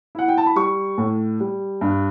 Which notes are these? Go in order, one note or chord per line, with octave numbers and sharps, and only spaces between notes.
E4 F#5
G5
A5
B5
G3 C#6
A2
G3
G2